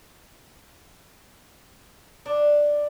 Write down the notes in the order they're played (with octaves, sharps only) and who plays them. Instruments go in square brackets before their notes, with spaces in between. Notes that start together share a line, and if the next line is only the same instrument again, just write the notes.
[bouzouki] D4